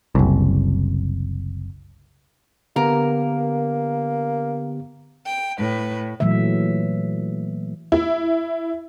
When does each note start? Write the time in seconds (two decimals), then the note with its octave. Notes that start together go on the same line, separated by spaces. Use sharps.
0.15 F#1 C2
2.76 D3 A#3 B3 G4 A#4
5.26 G5
5.58 A2 B4
6.20 A#2 E3 F#3 A3 E5
7.92 E4